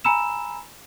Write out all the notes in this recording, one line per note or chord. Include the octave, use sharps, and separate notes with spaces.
G#5 A#5 B5 E6 E7